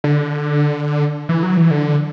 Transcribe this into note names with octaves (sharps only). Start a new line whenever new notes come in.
D3
E3
F#3
E3
D3